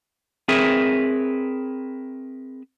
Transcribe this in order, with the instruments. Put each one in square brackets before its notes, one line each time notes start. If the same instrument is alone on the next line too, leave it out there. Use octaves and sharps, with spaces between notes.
[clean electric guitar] C4 G#4 A#4 B4 C#5 E5